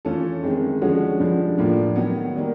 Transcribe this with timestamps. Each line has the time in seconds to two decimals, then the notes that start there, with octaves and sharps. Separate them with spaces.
0.05 E3 A3 C#4 F4 A4
0.43 F#2 D#3 G#3 C4
0.82 D3 F3 G#3 C#4 F#4
1.19 G2 D3 F3 G#3
1.58 A2 F3 A#3 D4 F4
1.96 D#3 F#3 B3
2.36 D#3 G3 A#3